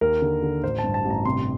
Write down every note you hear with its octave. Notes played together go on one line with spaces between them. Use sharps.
D#2 A#4
D3
D3
A1 C5
A5
G2
A5
A1
A#5
C3 C6